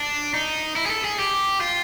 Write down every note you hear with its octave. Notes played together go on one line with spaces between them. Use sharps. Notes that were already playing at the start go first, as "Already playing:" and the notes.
Already playing: D4
D#4
E4
G#4
A4
G#4
G4
F4